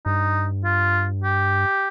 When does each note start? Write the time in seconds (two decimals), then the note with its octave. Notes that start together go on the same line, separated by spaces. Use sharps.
0.05 G2 D#4
0.64 F4
1.24 G4